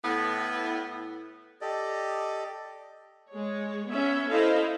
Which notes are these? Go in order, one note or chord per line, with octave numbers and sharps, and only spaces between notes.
A2 B3
G4 A4 D5 D#5
G#3 C#5
B3 C#4 E5
E4 A4 C5 D#5 F5